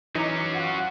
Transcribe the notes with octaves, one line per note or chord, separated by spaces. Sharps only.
E3 F#3 C#4 D#4 E4 D6
F4 F#5